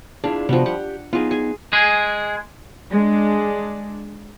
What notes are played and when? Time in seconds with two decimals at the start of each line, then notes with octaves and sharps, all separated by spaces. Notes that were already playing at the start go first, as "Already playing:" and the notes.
0.24 D4 E4 F4 G#4
0.49 C3 F3 G3 B3 F#4
0.66 G4 F#5
1.13 B3 D#4 F4 G#4
1.31 G#4 G#5
1.73 G#3 G#4
2.91 G#3 D4